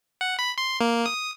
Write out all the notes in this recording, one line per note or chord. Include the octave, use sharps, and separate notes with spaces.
F#5
B5
C6
A#3
D#6